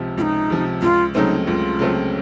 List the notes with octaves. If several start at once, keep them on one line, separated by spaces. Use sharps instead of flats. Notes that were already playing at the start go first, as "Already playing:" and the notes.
Already playing: C#2 C3 F3
C#2 D#4 F4
C3 F3
C#2 F4
C#3 F#3 A3 C4 D#4
C#2 F4
C#3 F#3 A3 C4